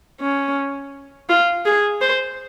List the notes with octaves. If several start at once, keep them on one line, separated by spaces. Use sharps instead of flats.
C#4
F4
G#4
C5